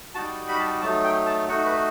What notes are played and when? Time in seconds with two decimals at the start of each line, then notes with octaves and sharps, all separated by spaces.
0.15 G3 D#4 F#4 A5
0.48 B5
0.59 A5
0.81 F#3 A3 D#4 A5
1.04 G5
1.26 A5
1.49 A3 D#4 F#4 F#5
1.66 B4